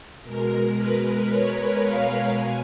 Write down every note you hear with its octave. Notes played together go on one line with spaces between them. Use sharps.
B2 G#3 A#4
B4
C#5
F5
B2 G#5